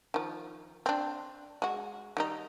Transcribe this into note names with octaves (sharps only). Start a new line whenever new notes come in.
D#3 F3
C4 D4
G#3 F#4
D#3 G3 D#4